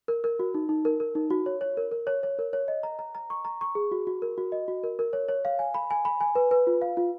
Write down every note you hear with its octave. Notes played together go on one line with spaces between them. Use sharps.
A#4
A#4
F#4
D#4
D#4
A#4
A#4
D#4
F#4
C#5
C#5
A#4
A#4
C#5
C#5
A#4
C#5
D#5
A#5
A#5
A#5
C#6
A#5
C#6
G#4
F#4
F#4
A#4
F#4
D#5
F#4
A#4
A#4
C#5
C#5
F5
G#5
B5
G#5
B5
G#5
B4
B4
F4
F5
F4